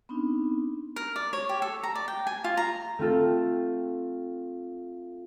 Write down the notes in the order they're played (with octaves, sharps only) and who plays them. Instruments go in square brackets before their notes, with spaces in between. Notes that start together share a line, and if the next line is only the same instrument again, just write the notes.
[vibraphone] B3 C4 D4 D#4
[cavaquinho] A#4
D5
C#5
G4
A4
A#5
D5
G5
G#5
F4
A#5
[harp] A3 C4 F4 A4